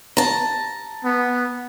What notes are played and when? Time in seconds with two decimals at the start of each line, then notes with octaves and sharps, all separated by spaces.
0.17 A5 A#5
1.04 B3